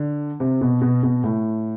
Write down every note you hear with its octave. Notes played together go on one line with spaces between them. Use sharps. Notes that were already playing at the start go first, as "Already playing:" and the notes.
Already playing: D3
C3
B2
B2
B2
A2